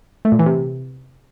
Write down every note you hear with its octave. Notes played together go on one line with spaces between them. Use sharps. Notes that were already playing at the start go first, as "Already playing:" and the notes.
A3
A#2
E3
C3